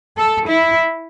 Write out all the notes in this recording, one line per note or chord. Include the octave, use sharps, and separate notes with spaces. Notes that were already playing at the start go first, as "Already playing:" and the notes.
A4
E4